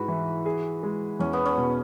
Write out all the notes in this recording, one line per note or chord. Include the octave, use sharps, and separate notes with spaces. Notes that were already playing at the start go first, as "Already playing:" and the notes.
Already playing: G#2 G#3 E4 F#4 B4
E3
G#4
G#3
E2 C#4
B3
C#4
B2